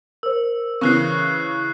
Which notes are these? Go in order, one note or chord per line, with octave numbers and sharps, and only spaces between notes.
A#4 C5 E6
C#3 E3 C#6 F#6 C7